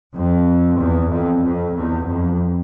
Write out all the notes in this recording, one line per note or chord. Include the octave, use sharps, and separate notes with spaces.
F2
E2
F2
F2
E2
F2